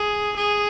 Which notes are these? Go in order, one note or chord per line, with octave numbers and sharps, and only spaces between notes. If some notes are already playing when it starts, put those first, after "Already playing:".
Already playing: G#4
G#4